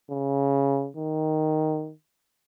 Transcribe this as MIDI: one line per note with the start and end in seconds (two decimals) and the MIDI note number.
0.11 0.88 49
0.97 1.92 51